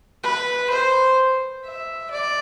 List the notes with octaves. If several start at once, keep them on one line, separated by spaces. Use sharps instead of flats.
B4
C5
E5
D5